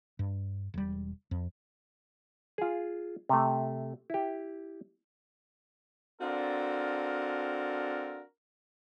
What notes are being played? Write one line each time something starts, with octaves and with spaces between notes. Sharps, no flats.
G2
E1 G3
F2
F4 G#4
C3 A3
E4 G4
C4 D4 F4 F#4 A4 A#4